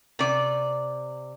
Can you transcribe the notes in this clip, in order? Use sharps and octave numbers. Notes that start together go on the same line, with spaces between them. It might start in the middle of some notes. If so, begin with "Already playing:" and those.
C3 D5